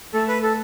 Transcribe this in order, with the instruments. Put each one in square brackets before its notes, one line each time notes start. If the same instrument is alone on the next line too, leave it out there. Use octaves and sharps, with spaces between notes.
[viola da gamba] A3 [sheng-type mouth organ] A4
[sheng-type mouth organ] B4
A4